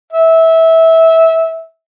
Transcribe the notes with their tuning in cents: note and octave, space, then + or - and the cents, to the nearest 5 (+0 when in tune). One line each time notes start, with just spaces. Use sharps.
E5 -20